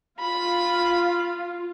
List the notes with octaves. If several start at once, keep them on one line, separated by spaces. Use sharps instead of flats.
F4 B5